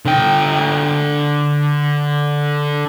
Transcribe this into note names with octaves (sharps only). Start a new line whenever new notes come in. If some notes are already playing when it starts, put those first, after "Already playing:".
D3 G5